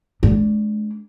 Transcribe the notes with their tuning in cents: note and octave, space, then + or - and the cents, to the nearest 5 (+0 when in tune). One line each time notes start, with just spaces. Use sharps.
G#3 +35 D4 -15